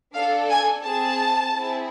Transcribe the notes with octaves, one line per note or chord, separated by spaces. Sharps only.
D4 A4 F5
G#5
C4 G#4 A5
C4 E4 G#4